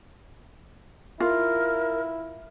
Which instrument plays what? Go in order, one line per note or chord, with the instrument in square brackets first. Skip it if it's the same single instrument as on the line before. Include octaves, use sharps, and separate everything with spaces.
[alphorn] E4 [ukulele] F4 [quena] A#4